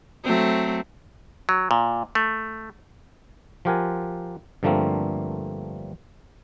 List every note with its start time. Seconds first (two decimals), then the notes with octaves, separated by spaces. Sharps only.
0.23 F#3 A3 C4
1.49 F#3
1.71 A#2
2.15 A3
3.65 F3 F4 G4 A#4 F#5 G#5
4.63 G2 D3 F3 A3 A#3 C4